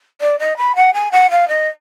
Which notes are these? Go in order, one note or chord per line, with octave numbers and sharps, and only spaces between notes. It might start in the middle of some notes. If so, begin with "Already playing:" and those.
D5
D#5
B5
F#5
G#5
F#5
F5
D#5